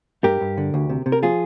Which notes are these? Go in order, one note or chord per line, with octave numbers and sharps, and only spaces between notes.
G2 G4 A#4
G2
D3
D2
C3
C3
A#4
F3 F4 G#4